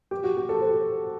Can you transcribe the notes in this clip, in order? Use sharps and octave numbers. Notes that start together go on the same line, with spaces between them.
G4
F#4
G4
A4
C5